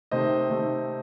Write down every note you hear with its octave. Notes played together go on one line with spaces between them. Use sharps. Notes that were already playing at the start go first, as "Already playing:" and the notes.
C3 D#3 A3 C5 D#5
C3 D#3 A3